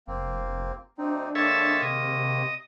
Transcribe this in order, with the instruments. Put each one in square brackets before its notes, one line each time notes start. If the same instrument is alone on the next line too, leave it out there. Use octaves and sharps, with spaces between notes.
[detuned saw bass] F1 [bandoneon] A#3 C4
[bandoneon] D2 C4 D#4 [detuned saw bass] D4
[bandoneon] D#3 G#3 A#3 [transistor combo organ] A4 C#5 E5
[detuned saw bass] C3 [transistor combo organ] D#5